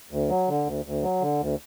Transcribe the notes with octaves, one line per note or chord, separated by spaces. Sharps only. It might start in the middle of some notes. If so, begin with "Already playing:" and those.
D2
F#3
D3
D2
D2
F#3
D3
D2